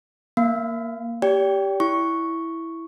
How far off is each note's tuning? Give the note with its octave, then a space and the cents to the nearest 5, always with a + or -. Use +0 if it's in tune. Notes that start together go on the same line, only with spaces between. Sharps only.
A#3 +0 F5 -10
G4 +0 D5 -40 G5 +0
E4 +0 C#6 +0